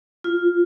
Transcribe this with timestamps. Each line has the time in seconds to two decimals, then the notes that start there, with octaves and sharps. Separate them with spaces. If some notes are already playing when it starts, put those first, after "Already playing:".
0.24 F4